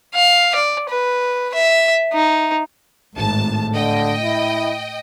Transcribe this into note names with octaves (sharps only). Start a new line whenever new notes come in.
F5
D5
B4
E5
D#4
G#1 A2 A5
D3 D#5 G5
E4